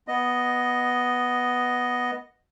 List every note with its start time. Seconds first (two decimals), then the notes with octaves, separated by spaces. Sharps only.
0.08 B3 D#5